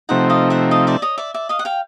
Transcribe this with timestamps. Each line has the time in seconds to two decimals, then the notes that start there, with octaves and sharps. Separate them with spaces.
0.09 C3 F3 A3 C4 D#4 E5 F#5
0.30 D#5 F5
0.50 E5 F#5
0.71 D#5 F5
0.87 D5 E5
1.02 C#5 D#5
1.18 D5 E5
1.34 D5 E5
1.49 D#5 F5
1.59 F#5
1.65 F5 G5